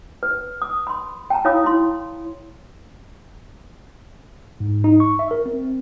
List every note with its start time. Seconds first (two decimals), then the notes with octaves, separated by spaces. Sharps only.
0.23 B4
0.62 D#6
0.87 B5 C6
1.30 G5 A5 A#5
1.45 E4 C#5 F5 B5 D#6
1.64 E4 C6
4.60 G#2
4.84 D#4
5.00 C#6
5.19 E5
5.31 A#4
5.46 C4